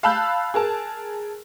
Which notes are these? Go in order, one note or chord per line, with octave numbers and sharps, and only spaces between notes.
F5 A5 B5 E6 F#6 G6
G#4 A#4 A5